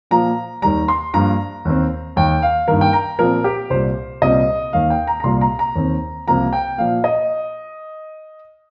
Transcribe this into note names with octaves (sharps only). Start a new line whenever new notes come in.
A#2 F3 A#3 A#5
D#2 D#3 G3 A#5
C6
G2 F3 A#3 A#5
D#2 D#3 C4
D#2 D#3 A#3 G5
F5
G2 D#3 A#3 A#4
G5
A#5
A#2 F3 C4 A#4
G4
C2 A#2 G3 C5
C2 A#2 G3 C4 D#5
D#2 D#3 A#3 F5
G5
A#5
A#5
C2 A#2 G3 A#3 C6
A#5
A#5
D#2 D#3 C4
C2 C3 F3 A#3 A#5
G5
A#2 F3 A#3 F5
D#5